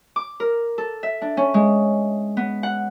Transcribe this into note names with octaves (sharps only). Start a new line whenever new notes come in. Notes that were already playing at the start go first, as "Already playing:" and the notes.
D6
A#4
A4
E5
D4
C#4
G#3
B3
F#5